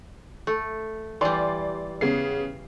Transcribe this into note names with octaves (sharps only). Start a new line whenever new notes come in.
A3
E3 G3 D5 C6
C#3 B3 C7